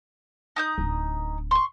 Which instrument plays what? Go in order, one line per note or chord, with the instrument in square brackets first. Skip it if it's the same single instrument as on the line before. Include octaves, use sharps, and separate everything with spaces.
[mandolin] D#4 D#6 G6
[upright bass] D1 D4
[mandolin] C6 C#6